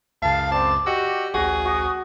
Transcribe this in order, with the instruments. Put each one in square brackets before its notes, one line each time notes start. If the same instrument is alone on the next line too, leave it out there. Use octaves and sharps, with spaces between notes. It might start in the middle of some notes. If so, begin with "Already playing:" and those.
[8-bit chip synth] C#2 F#2 C#3 [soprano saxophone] F5 [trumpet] A5
[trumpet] C4 [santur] D5 [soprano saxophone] A5
[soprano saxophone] F#4 [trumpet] G4 [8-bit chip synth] D#5 E6
[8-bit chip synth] A1 D2 [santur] F#4 [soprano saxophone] G#4
[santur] F#4 [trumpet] D#6